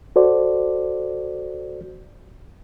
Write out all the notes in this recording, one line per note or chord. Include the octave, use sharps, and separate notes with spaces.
F#4 A4 C5 D5